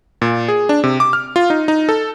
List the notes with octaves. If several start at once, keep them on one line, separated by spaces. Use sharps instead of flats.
A#2
G#4
D4
C3
D6
F6
F4
D#4
D#4
A4